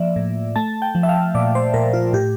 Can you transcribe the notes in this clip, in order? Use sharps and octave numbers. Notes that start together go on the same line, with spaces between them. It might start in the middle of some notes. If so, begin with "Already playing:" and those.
Already playing: F3 A#3 D5 E5
A2
A3 A5
G5
F3
E5
F5
A#2 D5
C5
A#2 A#4
F4
A2 G4